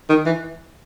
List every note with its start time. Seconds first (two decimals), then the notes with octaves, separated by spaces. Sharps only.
0.10 D#3
0.26 E3